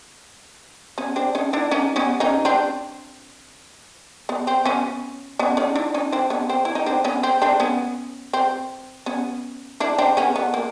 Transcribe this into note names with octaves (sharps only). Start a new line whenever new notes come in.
B3 C#4
C4 D4
C#4 D#4
D4 E4
C#4 D#4
B3 C#4
C#4 D#4
C4 D4
B3
C4
B3 C#4
B3 C#4
C#4 D#4
D4 E4
C#4 D#4
C4 D4
B3 C#4
C4
E4
D#4
C4 D4
B3 C#4
C4
C4 D4
B3 C#4
C4
B3 C#4
D4 E4
C4 D4
B3 C#4
B3
A#3